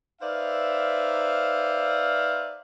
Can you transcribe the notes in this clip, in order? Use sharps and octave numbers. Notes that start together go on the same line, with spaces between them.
D#4 B4 C5 D5 E5 F5